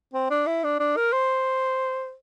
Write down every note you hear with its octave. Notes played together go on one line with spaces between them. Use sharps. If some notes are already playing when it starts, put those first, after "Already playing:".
C4
D4
E4
D4
D4
A#4
C5